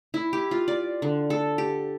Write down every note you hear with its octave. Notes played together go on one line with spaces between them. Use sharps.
E4
G4
F4
D5
D3
A4
G4